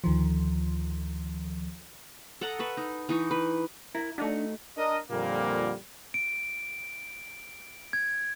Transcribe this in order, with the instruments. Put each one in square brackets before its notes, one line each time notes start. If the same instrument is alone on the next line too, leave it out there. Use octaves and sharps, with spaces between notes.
[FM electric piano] D2 D#3 F3
[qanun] A4 D#5 F#5 A#5
B4 E5 C#6
D#4
E3 D#4 C#6
B4
[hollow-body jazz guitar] E4 A#4
[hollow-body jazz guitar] A3 D#4 F#4 [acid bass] D4
[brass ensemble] D4 A#4 D#5
F2 A#2 D3 G3 A#3
[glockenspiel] D7
G#6